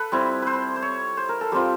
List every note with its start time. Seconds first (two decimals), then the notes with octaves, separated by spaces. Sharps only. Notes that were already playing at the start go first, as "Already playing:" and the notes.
Already playing: A4 B4
0.12 G3 C4 E4
0.42 B4 C5
0.76 C5
0.82 C#5
1.17 C5
1.29 A#4
1.41 A4
1.52 G3 C4 F4 G4